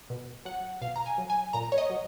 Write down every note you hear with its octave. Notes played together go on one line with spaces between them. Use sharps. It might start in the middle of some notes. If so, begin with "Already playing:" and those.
B2
F#3 F#5
B2 F5
A#5
G#5
F#3
G#5
A#2 A#5
C#5
D#5
F#3